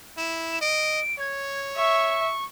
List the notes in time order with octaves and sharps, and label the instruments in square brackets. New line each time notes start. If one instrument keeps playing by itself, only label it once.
[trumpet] E4 [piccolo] E7
[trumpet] D#5 [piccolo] D7
[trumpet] C#5 [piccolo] G#6
[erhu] E5 [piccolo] C#6